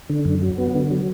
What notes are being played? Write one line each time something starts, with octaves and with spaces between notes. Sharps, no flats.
D3
F#2
F#3
B3
D3
F#3